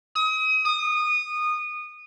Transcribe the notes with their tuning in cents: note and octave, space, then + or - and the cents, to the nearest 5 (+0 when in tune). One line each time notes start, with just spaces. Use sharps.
D#6 +35
D#6 -20